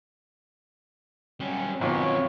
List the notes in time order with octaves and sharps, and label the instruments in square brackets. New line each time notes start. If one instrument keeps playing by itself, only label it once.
[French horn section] F#3 [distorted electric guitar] G3 C#4
[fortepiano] G#1 B2 [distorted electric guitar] F#2 C4 [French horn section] F4 [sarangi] C#5